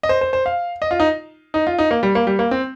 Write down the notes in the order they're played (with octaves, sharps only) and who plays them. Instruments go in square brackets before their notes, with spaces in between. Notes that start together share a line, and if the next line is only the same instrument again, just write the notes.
[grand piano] D#5
C5
C5
C5
F5
D#5
F4
D#4
D#4
F4
D#4
A#3
G3
A#3
G3
A#3
C4